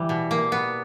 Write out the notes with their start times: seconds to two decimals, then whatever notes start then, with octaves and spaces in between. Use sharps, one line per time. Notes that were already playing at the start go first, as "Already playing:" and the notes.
Already playing: E3 G3
0.09 B2
0.31 A#3
0.52 B3